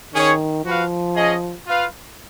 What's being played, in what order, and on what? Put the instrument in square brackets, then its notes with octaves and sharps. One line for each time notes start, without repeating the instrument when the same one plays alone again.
[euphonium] D#3 [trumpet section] C#4 G#4 C#5
[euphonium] F3 [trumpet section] F#4 B4 F5
[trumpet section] C#4 G#4 D#5
F4 B4 F5